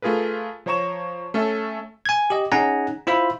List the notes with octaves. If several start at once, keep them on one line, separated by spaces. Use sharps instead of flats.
A3 F4 G#4 A#4 B4
F3 C5 C#5 A#5 C#6 E7
A3 C#4 A4 E5
G#5 G#6
G4 D#5
C#4 D#4 G#4 F#5 G#5 A#5
E4 F4 C5 E5 B5